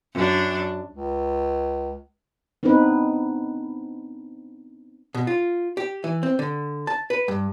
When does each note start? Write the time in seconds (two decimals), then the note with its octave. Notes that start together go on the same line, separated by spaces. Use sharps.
0.13 F#2 D4
0.92 C#2
2.63 B3 C4 D4 D#4 B4
5.14 B2
5.27 F4
5.77 G4
6.04 E3
6.23 C4
6.39 D3
6.87 A5
7.10 B4
7.28 G2